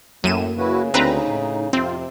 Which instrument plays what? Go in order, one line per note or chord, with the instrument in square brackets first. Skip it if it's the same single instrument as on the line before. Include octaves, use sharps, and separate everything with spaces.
[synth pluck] F#2 D#7 E7 [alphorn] A2 [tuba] A#3
[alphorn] C#3 [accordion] E4 F#4 B4
[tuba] D2 [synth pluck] C4 B4 A#5 [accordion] D#4
[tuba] A2
[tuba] F2 [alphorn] C3 [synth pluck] C4 [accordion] F4